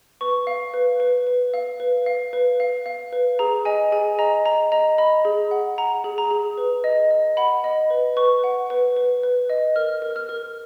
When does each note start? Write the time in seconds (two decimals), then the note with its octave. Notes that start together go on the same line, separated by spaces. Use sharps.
0.21 B4 C#6
0.47 F5
0.74 B4
1.00 B4
1.27 B4
1.54 F5
1.80 B4
2.06 F5
2.33 B4
2.60 F5
2.86 F5
3.13 B4
3.39 G#4 A#5
3.65 D#5 G#5
3.92 G#4 G#5
4.18 D#5 A#5
4.45 D#5 A#5
4.72 D#5 A#5
4.98 D#5 B5
5.25 G#4
5.51 F#5
5.78 F#5 A#5
6.04 G#4
6.18 A#5
6.31 G#4
6.57 B4
6.84 D#5
7.11 D#5
7.37 F#5 B5
7.64 D#5
7.90 B4
8.17 B4 C#6
8.44 F#5
8.70 B4
8.97 B4
9.23 B4
9.49 D#5
9.76 A#4 F6
10.02 A#4
10.16 F6
10.29 A#4